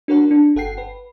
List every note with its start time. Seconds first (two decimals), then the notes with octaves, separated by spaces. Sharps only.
0.08 D4 F#4 A#4 C#5 F#5
0.31 D4
0.56 G1 A4 F#5 G5 C7
0.78 B4